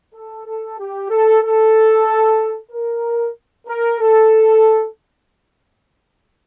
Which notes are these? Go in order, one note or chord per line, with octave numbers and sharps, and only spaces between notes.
A4
A4
G4
A4
A4
A#4
A#4
A4